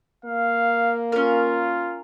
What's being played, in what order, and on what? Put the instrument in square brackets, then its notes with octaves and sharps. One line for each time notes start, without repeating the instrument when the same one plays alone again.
[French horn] A#3 [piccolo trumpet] F5
[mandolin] C#4 A#4 [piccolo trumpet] F4